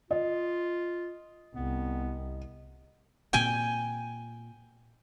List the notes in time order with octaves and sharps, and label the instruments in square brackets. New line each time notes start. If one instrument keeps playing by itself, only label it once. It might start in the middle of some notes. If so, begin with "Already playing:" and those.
[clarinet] F4 [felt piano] D#5
[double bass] C2 [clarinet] B3
[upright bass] A#2 C4 [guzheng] G5 G#5